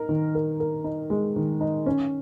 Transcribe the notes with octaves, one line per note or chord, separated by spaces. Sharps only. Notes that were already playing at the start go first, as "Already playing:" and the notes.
Already playing: D#4 A#4
D#3
A#4
A#4
D#4
G#3
D#3
D#4
C#4